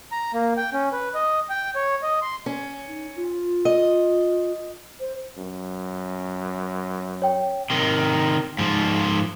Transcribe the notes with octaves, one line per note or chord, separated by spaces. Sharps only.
A#5
A#3
G5
C#4
B4
D#5
G5
C#5
D#5
C6
C#4
D#4
F4
D#5
C5
F#2
C#5 G5
C3 D#3
G#2 F3